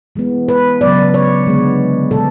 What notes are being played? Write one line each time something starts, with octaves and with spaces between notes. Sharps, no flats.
E3 G#3 B3
B4
C#3 F#3 B3 D5
C#5
D3 G#3 B3
B2 G#3 B3 A4